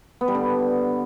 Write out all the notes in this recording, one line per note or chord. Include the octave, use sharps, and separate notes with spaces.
B3
G3
D3